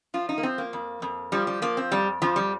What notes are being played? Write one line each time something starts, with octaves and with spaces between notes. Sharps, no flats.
F3 F4
D#4
A#3
F3 C4
A#3
F2
F2
F3 G3
G3
F3 A#3
C4
F2 G3
F2 F3
G3